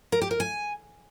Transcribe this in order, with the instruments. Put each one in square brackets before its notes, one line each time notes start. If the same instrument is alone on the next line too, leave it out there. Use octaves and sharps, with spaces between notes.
[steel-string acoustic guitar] A#4
G4
A#4
G#5